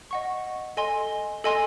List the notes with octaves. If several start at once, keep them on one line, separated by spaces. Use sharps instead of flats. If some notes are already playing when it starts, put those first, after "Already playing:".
D#5 F#5 C#6
A4 D#5 G#5 C6
A4 D#5 G#5 C6